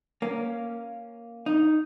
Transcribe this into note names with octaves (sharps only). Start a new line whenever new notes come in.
A#3 C#4
D#4